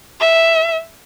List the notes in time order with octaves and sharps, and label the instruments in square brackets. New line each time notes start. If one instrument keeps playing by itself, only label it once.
[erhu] E5